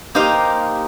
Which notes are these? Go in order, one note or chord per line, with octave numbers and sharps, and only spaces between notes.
A#3 D#4 G4 C5 D#5 F5